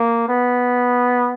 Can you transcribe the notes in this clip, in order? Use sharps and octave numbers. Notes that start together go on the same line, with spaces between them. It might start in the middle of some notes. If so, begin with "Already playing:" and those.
Already playing: A#3
B3